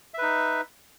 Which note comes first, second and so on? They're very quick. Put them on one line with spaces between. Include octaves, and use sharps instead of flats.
E5 B4 D#4